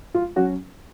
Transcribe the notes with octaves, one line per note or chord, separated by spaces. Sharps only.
F4
F#3 C#4 F#4